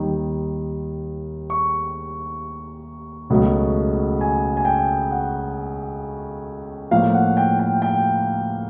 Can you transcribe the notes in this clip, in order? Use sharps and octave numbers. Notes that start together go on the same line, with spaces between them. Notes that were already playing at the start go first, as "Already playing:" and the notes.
Already playing: D#2 D#3 G3
C#6
C#2 B2 F#3 A3
G#5
G#5
G5
F#5
A2 F3 A#3 F5
F#5
G5
G5
G5